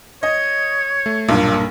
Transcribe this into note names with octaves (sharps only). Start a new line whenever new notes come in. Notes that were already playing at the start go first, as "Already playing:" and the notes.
C#5 D#5
A3
B1 G2 A#2 A#3